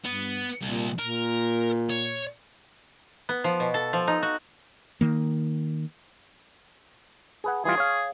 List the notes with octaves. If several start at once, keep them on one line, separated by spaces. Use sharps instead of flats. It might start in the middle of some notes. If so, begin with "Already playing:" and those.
G2 B3
C2 A#2
A#2 A#4
C#5
B3
F3
B2
A4
F3
D#4
F#4
D#3 A#3
G#4 B4 F#5
E3 G3 F4 G#4
C#5 F5